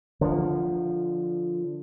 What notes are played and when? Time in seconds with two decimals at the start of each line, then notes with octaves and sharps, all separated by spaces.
0.21 D3 F3